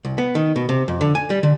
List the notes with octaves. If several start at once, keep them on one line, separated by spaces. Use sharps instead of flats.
C2
B3
D#3
B2
C3
F2
D3
G#5
G3
D3